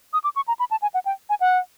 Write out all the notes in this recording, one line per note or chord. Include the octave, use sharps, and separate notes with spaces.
D#6
D6
C#6
A#5
B5
A5
G#5
F#5
G5
G#5
F#5